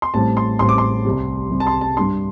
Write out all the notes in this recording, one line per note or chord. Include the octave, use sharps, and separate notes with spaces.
C6
A1 A2 G3 C4 A5
C6
A1 A2 G3 C4 C6
D6
C6
C2 C3 G3
C2 C3 G3
A5
C6
A5
G2 G3 D4 C6